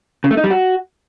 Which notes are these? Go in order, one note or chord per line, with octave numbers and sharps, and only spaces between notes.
C#3
A3
D#4
G3
F#4